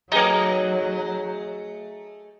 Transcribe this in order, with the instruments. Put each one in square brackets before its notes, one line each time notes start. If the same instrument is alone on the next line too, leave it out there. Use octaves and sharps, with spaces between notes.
[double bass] F#3 [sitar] A3 G#4 D#5 [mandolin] D#4